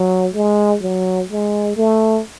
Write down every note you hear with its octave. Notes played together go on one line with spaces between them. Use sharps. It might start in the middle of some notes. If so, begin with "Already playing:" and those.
Already playing: F#3
G#3
F#3
G#3
A3